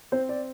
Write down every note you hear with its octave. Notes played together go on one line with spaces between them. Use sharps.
C4 C5
D5